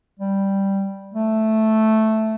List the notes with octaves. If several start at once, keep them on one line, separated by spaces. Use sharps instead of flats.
G3
A3